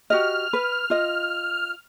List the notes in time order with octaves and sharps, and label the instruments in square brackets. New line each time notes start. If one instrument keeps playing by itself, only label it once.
[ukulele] F#4 G4 D#5 [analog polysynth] F6
[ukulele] B4
F4 D#5